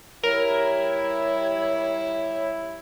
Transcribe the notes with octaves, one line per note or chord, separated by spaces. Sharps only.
G3 E4 A#4 C#5